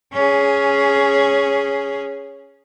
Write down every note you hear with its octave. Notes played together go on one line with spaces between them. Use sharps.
C#4 G#4